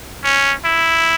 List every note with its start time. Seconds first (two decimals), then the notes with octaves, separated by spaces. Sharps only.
0.24 C#4
0.65 E4